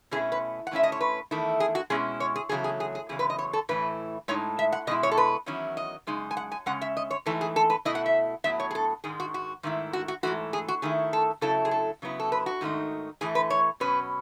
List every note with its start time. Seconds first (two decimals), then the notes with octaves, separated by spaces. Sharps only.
0.11 B2 A3 C#4 E4 G#4
0.32 B4
0.67 F#5
0.71 A2 G#3 C#4 E4 E5
0.83 D#5
0.92 C#5
1.01 B4
1.31 E2 D#3 A3 E4
1.60 G#4
1.75 F#4
1.90 B2 G#3 C#4 E4 G#4
2.20 C#5
2.36 G#4
2.49 E2 C#3 F#3 A3 G#4
2.64 G#4
2.80 G#4
2.95 G#4
3.09 E2 C#3 F#3 G#4
3.19 B4
3.30 D#5
3.39 C#5
3.53 A4
3.69 A2 E3 A3 E4 B4
4.28 A2 G#3 D#4 C#5
4.59 E5
4.72 F#5
4.87 B2 G#3 E4 D#5
5.03 C#5
5.11 A4
5.17 B4
5.46 E2 D#3 F#3 C#4 E4
5.77 D#5
6.07 F#2 C#3 G#3 D#4
6.31 G#5
6.37 F#5
6.52 G#5
6.66 C#3 G#3 C#4 F#5
6.81 E5
6.97 D#5
7.11 C#5
7.26 G#2 E3 A3 D#4 A4
7.41 G#4
7.56 A4
7.70 B4
7.85 B2 A3 E4 D#5
7.95 F#5
8.06 E5
8.44 A2 F#3 B3 E5
8.60 C#5
8.71 G#4
8.75 A4
9.04 G#2 D#3 G#3 G#4
9.20 F#4
9.34 F#4
9.63 G#2 D#3 A3 E4
9.93 F#4
10.08 F#4
10.23 G#2 E3 A3 F#4
10.53 G#4
10.68 F#4
10.82 D#3 A3 E4 G#4
11.13 A4
11.41 C#3 F#3 A3 E4 A4
11.65 G#4
11.71 A4
12.02 C#3 F#3 B3 E4
12.20 A4
12.32 B4
12.46 F#4
12.61 G#2 D#3 A3 D#4
13.21 A2 E3 A3 G#4
13.35 B4
13.50 C#5
13.80 B2 F#3 C#4 B4